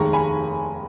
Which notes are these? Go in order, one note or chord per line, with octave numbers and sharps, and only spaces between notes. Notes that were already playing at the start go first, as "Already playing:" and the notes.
Already playing: F1 D#2 D#3 G#3 A#5 C#6
G#5 B5